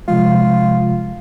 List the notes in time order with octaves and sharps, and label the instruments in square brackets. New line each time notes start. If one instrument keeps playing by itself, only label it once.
[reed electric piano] C3 F3 G#3 [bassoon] F4